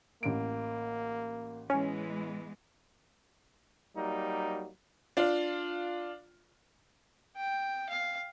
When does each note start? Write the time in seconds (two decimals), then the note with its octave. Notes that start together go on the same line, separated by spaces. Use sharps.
0.23 A1 A#3 D7
1.70 E3 G#3 B3 C#4
3.96 F#3 G3 A#3 D#4
5.17 D4 F4
7.36 G5
7.89 F5